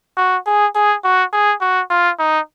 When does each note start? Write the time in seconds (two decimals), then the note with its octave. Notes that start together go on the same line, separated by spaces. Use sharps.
0.17 F#4
0.46 G#4
0.75 G#4
1.04 F#4
1.33 G#4
1.61 F#4
1.90 F4
2.19 D#4